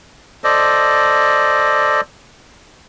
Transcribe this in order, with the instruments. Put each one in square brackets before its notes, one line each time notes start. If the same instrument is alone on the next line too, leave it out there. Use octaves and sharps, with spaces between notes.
[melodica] A4 C5 D5 D#5